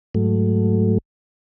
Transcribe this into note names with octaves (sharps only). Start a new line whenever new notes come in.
G#2 F#3 A3